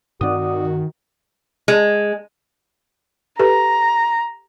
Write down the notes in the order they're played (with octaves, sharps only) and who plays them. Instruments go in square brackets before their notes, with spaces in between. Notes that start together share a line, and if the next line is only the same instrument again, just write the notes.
[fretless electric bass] G2 C4 [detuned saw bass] D#3 [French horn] F#4 [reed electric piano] D5 F#5 D#6
[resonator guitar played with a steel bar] G#3
[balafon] G4 A4 B4 [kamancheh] A#5